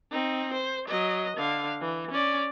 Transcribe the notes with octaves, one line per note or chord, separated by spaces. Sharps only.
C4 D#4
C5
F#3 D#5
D3 F5
E3
C#4 D5